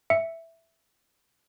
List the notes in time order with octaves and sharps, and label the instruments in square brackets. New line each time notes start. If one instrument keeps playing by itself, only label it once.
[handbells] E5 C#7